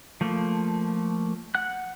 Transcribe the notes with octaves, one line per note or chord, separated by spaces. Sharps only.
F3 A3 A#3
F#5 F#6